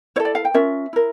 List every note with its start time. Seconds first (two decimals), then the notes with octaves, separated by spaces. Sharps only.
0.16 E4 C#5
0.20 A4
0.25 D5
0.35 F5
0.45 G5
0.54 C#4 F4 A#4 E5
0.93 E4 A#4